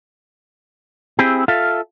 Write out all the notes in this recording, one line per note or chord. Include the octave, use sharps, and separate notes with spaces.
C4 E4 G4 G#4
F4 A4 E5 F5